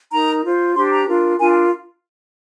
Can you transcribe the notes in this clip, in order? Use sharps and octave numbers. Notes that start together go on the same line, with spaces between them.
D#4 A#4 A#5
F4 C5
D4 G4 C5 C6
A#5
D4 F4 A#4
D4 F4 A#4 G#5